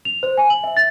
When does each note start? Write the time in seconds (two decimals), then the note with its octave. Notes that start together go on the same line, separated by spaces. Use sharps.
0.05 F7
0.23 C5
0.37 G#5
0.50 F#7
0.63 E5
0.77 A6